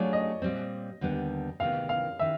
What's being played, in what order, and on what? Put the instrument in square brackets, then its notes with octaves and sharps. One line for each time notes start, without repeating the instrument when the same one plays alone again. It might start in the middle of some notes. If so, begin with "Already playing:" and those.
Already playing: [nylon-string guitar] F#3 A3 D4 F4 G#4 [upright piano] C#5 D5
[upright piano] D#5
[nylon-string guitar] A#2 G3 C4
D#2 D3 G3 B3 D4
[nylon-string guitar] D2 C3 D#3 G#3 B3 [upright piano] F5
[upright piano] F5
[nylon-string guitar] D#3 [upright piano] E5